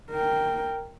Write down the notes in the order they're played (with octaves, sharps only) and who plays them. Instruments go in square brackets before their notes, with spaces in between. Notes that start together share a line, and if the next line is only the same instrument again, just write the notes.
[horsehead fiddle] A#4 G5